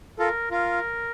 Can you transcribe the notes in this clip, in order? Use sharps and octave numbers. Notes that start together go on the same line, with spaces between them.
F4 A4 A#4
F4 A#4